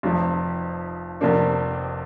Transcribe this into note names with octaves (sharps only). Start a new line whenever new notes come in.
F1 F2 F3
F1 F2 C3 A#3 D4